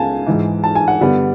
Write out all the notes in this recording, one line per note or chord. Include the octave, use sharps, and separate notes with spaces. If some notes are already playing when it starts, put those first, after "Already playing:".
Already playing: C#2 C#3 B3 F5 G#5 A5
G#2 E3 G#3
A5
G#5
F#5
G2 D3 G3 B3